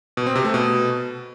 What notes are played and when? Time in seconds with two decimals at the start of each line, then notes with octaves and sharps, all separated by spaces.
0.17 B2
0.26 C4
0.35 C3
0.45 A3
0.54 B2